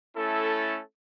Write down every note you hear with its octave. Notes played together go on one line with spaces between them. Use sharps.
A3 C#4 E4 A4